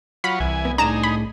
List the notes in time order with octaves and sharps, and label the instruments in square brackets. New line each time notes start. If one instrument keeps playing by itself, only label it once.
[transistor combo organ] F#3 F4 C#5 [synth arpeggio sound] B5
[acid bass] C2 [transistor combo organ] E3 G#5
[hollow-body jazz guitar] B3
[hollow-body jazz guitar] A2 D4 [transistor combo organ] D#4 G#4 [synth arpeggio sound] A#5 E7
[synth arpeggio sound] B5